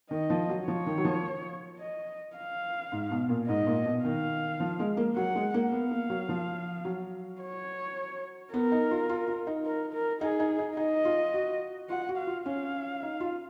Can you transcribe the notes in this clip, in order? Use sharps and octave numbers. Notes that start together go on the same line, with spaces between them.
D#3 D#5
F3
F#3
F3 C#5
D#3
F#3
F3
D#5
F5
G#2
B2
A#2
G#2 D#5
A#2
B2
D#3 F5
F3
G#3
A#3
F#3 F#5
G#3
A#3
B3 F5
A#3
F#3
F3
F#3
C#5
B3 A#4
D#4
F4
F4
F4
D#4
A#4
A#4
D#4 G#4
D#4
D#4
D#4 D#5
F4
F#4
F4 F#5
F#4
F5
F4
C#4 F5
D#4
F4